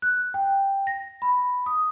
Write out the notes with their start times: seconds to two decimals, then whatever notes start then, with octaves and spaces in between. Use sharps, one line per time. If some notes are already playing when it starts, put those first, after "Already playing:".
0.02 F#6
0.34 G5
0.87 A#6
1.22 B5
1.66 D#6